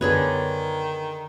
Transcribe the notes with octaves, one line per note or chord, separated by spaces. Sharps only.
F#2 D3 D#3 B3 G#4 B4 C#5